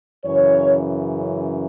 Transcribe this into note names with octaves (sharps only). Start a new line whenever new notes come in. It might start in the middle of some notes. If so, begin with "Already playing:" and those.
F#2 C#3 E3 C#5